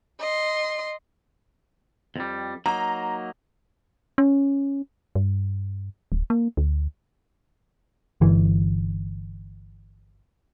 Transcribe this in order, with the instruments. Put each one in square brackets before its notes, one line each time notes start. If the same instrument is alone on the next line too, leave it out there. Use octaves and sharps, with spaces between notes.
[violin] D#5 C6
[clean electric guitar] F2 G3
[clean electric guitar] F#3 A#3 D#4 [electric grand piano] A#5
[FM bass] C#4
G2
D1
A#3
D2
[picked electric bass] G1 E3